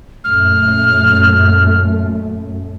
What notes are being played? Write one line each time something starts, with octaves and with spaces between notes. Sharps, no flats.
F#2 A#2 A3 F6